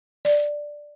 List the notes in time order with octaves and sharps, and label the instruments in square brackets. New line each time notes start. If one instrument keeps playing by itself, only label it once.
[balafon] D5